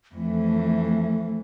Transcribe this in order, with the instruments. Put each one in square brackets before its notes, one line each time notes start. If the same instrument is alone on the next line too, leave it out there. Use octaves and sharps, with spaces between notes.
[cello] F2 E3 [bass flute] A3